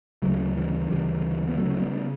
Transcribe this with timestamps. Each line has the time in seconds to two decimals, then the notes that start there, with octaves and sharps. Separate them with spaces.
0.22 D2 C#3 F#3 A3
0.56 E3 G3
0.89 D2 C#3 E3 G3
1.48 B3
1.57 D2 C#3 F#3 A3
1.80 G3 B3